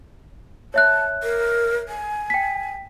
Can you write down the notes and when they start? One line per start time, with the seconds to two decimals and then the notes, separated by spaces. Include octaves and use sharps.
0.74 C#5 E5 A5 F#6
1.23 A#4
1.89 G#5
2.30 G5 B6